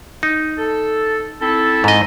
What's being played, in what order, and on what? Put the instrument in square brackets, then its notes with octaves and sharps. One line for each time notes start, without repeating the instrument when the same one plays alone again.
[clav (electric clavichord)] D#4
[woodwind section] A4
C4 E4 A4
[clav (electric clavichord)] G#2 D#5